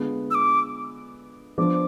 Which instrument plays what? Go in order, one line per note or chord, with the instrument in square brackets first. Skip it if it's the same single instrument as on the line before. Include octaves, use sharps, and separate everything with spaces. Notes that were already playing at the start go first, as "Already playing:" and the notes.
Already playing: [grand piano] D3 G#3 B3 F4 G#4
[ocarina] E6
D6
[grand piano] F3 B3 D4 [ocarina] D6